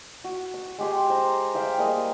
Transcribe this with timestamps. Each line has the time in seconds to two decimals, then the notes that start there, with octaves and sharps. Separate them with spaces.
0.24 F#4
0.54 E6
0.79 G#3 G4 C6
1.10 C5 A#5
1.54 C5 E5 F5 G5
1.77 G3 G#3 A#3 D#5